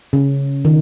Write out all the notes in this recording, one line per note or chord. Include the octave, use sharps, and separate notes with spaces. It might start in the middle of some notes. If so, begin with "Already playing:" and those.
C#3
D#3